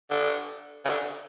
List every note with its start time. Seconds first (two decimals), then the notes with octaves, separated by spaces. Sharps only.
0.10 D3
0.85 C#3
0.89 D3